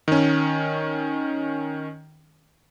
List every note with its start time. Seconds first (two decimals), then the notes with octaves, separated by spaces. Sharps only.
0.08 D#3 C#4